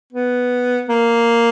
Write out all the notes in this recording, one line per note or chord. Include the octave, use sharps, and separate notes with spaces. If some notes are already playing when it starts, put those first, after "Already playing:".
B3
A#3